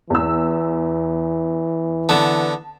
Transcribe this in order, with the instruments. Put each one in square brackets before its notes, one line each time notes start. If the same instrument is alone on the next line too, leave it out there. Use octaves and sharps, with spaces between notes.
[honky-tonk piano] E2 E6 [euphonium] E3
[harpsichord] D3 B3 [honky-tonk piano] A5 E7